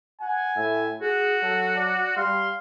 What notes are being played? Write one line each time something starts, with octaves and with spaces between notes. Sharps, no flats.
F#5 G#5
A2 E5
F#4 G#4
F#3 A4
D5
G3 F5 C6